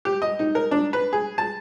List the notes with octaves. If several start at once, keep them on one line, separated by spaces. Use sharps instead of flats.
G4
D#5
D#4
A#4
D4
B4
G#4
A5